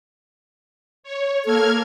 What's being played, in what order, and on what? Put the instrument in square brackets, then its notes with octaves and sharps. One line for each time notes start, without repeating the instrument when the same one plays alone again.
[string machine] C#5
[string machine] A#3 F6 G#6 [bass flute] A4